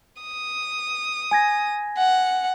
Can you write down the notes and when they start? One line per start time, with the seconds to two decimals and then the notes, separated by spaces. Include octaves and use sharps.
0.22 D#6
1.31 G#5 G#6 A#6
1.98 F#5